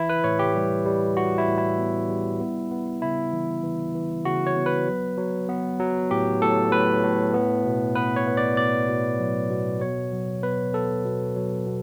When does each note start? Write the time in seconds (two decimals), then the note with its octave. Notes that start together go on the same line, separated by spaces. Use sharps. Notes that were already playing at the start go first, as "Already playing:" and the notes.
Already playing: E3 E4
0.09 B4
0.24 A2 C#5
0.39 G4
0.55 G3
0.86 G3
1.16 G3 F#4
1.38 E4
1.48 A2
1.58 E4
1.79 B3
2.09 G3
2.40 B3
2.71 B3
3.02 C#3 E4
3.33 E3
3.63 E3
3.95 E3
4.25 C#3 F#4
4.47 C#5
4.57 B3
4.66 B4
4.88 F#3
5.18 F#3
5.49 B3
5.80 F#3
6.11 A2 G4
6.41 A2 A4
6.72 A2 B4
7.04 A2
7.34 B3
7.65 B2
7.96 B3 B4
8.16 C#5
8.27 B3
8.37 D5
8.57 B2 D5
8.88 B2
9.20 F#3
9.51 B2
9.81 B2 C#5
10.13 F#3
10.42 B3 B4
10.73 B3 A4
11.05 B2
11.36 F#3
11.67 B2